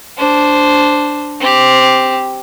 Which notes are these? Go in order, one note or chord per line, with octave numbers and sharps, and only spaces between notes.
D4 C5
C4 G4